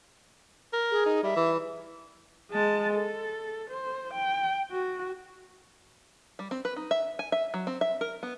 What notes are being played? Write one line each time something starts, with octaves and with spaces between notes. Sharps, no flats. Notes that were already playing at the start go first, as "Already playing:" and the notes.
A#4
G#4
D#4
G3 E5
E3
G#3 A5
A4
C5
G5
F#4
G3
C4
B4
D#4
E5
G#5
E5
F#3
C4
E5
A#4
B3